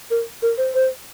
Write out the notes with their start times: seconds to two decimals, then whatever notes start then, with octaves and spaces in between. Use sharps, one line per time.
0.11 A#4
0.42 A#4
0.58 C5
0.75 C5